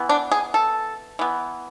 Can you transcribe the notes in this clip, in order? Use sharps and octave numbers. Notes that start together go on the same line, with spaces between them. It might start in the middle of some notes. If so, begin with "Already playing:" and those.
Already playing: E3 B3
D4
G#4
A4
E3 B3